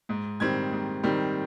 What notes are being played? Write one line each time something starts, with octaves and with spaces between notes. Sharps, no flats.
G#2
D#3 G3 C4 G#6
G#2
D#3 G3 C4